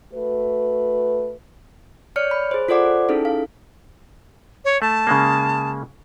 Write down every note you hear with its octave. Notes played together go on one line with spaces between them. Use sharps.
A3 F#4 B4
C#5 D5 F6 C#7
B5
G#4 C5
F4 A4 C5 D5 F#5 D6
C#4 D#4 E4 G#4 A4
F5
C#5
A3 A5
C#3 G#3 A#3